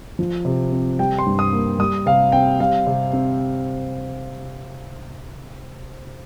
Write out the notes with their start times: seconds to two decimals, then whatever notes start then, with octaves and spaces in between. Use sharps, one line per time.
0.19 F3
0.45 C3
0.72 C4
0.99 G3 G5
1.19 C6
1.26 G2
1.39 D#6
1.52 A#3
1.79 G3 D#6
2.06 C3 F5
2.32 C4 G5
2.60 G3 F5
2.87 C3
3.13 C4